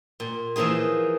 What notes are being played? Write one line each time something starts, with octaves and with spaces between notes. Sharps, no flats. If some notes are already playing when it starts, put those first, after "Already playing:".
A#2
E3 F3 A#3 D#4 G#4